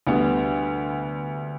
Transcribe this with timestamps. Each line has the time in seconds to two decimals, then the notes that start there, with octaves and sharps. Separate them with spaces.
0.07 D2 D3 G3 B3